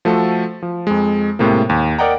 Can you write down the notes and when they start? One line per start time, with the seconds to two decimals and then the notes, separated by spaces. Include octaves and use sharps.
0.05 F3 A3 F#4 A4
0.62 F3
0.87 F2 G#3
1.39 A2 C3 G#3 A#3
1.69 D#2
1.99 A#4 D5 D#5 F#5 G5 A#5